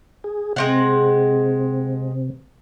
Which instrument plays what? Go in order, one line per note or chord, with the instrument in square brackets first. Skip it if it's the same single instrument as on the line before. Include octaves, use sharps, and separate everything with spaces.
[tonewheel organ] G#4
[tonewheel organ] C3 [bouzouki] G#3 C4 F#5